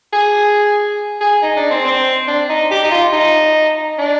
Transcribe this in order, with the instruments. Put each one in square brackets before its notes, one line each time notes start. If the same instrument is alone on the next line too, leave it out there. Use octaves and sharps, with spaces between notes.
[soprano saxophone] G#4
G#4
D#4
D4
C4
C4
D4
D#4
G4
D#4
F4
D#4
D4